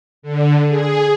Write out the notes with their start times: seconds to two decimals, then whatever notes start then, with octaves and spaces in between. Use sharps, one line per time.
0.22 D3
0.68 G#4